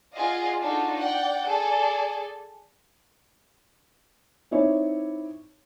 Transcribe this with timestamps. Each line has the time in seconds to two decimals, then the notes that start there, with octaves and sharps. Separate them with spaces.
0.16 F4 G#4 D5 D#5 F5 F#5
0.59 D4 D#4 F4 F#4 A4
0.96 D5 F#5 G5
1.45 G#4 A4 D5
4.51 C4 D#4 E4 C#5 D5